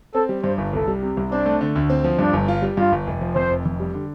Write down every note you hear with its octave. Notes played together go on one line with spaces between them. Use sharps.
C4 A4
G3
G2 C5
G1
C2 A4
G3
C3
C2
C4 D4
A3
D3
D2
C4
F3
G2 D4
G1
F4
G3
G2 F4
G1
F1
F3
F2 C5
F1
F2
G3
D3